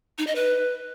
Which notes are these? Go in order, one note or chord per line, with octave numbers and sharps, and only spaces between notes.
D#4
D#5
B4